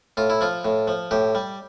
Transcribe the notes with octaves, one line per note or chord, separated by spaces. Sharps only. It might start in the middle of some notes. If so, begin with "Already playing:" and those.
A2 F4
E4
F3 F4
A2
F3
A2 G4
G3